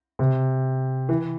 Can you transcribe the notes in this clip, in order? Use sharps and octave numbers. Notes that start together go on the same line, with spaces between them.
C3
E3